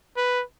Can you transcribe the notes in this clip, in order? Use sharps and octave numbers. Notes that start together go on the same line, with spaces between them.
B4